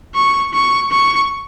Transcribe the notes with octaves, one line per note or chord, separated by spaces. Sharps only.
C#6
C#6
C#6